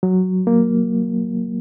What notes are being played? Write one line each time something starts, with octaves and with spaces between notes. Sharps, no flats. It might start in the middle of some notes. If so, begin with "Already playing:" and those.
F#3
A#3